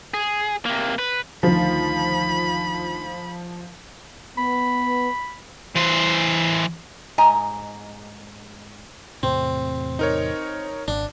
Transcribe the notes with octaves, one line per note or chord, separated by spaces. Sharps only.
G#4
C3 A#3
B4
D2 D#3 F3 B5
B3 B5
E3 C5
G#2 D#5 G#5 A#5
E2 A2 C3 C4
D#4 A#4 C#5
G#1 D4